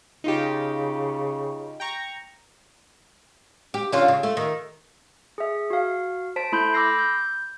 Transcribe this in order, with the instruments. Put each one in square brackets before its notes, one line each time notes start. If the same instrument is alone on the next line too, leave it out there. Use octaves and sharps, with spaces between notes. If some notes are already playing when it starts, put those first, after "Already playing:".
[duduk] C#3 [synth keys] D#4 F4 G4
[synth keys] G5 A#5 C#6
[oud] G4
D3 C#4 F4
C#3
A3
D#3
[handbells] G#4 E5
F#4 F5
C5 A5 B6 D7
A3 E4 B5 C6 G6
B5 D6 E6 G6 A#6 C7
G6